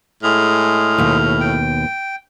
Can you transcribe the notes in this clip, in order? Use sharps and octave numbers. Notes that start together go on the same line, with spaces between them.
A2 G#3 G#4 F6
D#2 B2
G5